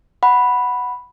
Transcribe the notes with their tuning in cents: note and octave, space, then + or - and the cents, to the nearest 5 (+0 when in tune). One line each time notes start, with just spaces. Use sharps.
F#5 +0 B5 +0